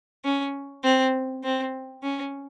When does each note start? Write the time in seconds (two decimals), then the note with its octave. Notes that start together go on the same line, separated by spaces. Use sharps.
0.25 C#4
0.84 C4
1.44 C4
2.03 C#4